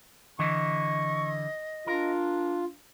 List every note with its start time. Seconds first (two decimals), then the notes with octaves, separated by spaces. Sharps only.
0.39 D3 E3 D#5 C#6
1.87 D4 F4 A#4